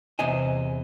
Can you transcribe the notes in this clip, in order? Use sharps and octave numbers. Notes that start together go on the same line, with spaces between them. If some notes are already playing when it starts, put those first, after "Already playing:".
E2 C3 C5 D#5 G#5